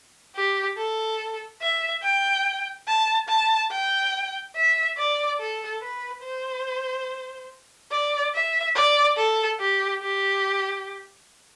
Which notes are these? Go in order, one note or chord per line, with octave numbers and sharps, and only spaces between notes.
G4
A4
E5
G5
A5
A5
G5
E5
D5
A4
B4
C5
D5
E5
D5
A4
G4
G4